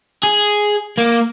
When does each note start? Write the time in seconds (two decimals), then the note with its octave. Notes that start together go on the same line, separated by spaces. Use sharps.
0.23 G#4
0.98 A#3